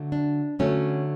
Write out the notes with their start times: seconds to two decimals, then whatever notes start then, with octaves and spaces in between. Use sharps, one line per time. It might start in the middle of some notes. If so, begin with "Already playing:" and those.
Already playing: D3 F#3 A3
0.12 D4
0.59 D3 F#3 A3 C#4